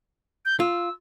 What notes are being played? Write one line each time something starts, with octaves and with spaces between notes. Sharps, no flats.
G6
F4 E6